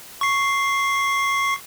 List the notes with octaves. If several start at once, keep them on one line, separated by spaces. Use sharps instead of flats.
C#6 C7